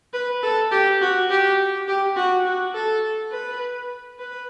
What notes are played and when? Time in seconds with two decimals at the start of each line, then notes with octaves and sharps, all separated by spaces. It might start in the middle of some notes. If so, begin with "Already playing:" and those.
0.14 B4
0.43 A4
0.71 G4
1.01 F#4
1.30 G4
1.88 G4
2.16 F#4
2.45 F#4
2.74 A4
3.31 B4
4.19 B4